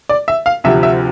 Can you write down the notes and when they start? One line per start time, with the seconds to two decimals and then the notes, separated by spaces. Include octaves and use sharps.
0.09 D5
0.28 E5
0.46 F5
0.64 D2 C3 F3 E5
0.83 E5